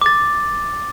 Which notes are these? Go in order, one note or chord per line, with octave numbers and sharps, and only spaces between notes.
D6 A6